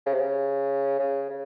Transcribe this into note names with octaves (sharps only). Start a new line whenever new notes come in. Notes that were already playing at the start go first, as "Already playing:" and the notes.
C#3
C3
C#3
C#3
C#3